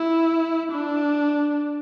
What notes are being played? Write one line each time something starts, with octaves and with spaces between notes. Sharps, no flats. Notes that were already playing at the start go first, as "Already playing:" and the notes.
Already playing: E4
D4